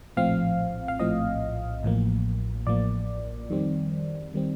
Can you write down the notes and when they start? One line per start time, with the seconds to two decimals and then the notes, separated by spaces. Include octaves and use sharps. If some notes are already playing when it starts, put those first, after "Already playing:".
0.17 A#1 A2 F3 C4 F5
0.88 F5
1.00 A#1 A2 F3 C4 D#5
1.83 A1 A2 F3 A#3
2.66 A1 A2 F3 A#3 D5
3.50 F2 D#3 G3 C4
4.34 D#3 G3 C4